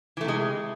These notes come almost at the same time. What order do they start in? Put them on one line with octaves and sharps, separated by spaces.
E3 A3 C3 G#3